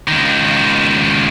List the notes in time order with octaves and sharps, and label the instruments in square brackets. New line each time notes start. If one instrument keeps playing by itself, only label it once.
[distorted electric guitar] C#2 D#3